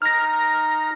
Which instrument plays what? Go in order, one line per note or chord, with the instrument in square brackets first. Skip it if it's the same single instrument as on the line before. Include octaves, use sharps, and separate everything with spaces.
[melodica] D#4 [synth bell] F6 A#6